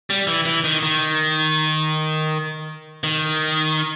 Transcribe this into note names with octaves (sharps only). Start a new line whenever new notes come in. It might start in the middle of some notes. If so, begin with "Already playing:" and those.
G3
E3
E3
D#3
D#3
D#3